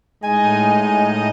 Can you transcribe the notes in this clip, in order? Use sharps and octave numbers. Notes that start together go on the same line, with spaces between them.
A2 G#3 D#4 D#5 G#5